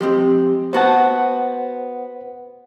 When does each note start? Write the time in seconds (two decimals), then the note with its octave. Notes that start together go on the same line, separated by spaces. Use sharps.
0.01 F3 G#3 C4 G4
0.73 B3 F#4 C5 F#5 A5